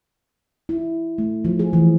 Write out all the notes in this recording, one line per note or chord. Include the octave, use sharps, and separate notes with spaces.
E4
A3
F3
G#4
E3